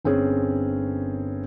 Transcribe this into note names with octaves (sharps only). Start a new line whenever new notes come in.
G1 C4 C#4 G#4